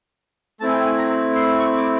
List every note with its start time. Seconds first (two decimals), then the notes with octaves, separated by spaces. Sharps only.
0.60 A3 C4 E4 A5
0.69 G#5
0.73 G5
0.85 G#5
0.98 A#5
1.35 C6
1.59 C#6
1.77 D6